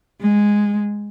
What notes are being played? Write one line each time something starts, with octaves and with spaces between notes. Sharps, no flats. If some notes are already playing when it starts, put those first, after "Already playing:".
G#3